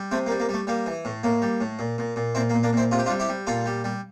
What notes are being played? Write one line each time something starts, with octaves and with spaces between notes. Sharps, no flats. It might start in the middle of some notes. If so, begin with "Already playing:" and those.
Already playing: G3
C3 A3 C4
A#3
G3
A#3
G3 A3
G3 A#3
E3
A2
A2 A#3
G3
A2
A#2
A#2
A#2
A#2 C4 E4
A#3
A#2
A#3 D4
A#2 C4 E4
C3 F4
G4
D4 F4
G3
E4 G4
G3
A#2 F4 A4
G3
G3